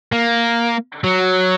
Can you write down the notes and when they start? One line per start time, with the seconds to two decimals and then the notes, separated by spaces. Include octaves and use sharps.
0.12 A#3
1.04 F#3